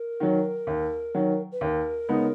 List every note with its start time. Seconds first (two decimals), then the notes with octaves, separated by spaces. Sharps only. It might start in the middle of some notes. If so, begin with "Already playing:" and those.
Already playing: A#4
0.20 D#3 F#3
0.67 D#2
1.14 D#3 F#3
1.52 B4
1.61 D#2 A#4
2.09 C#3 G#3 B3 D#4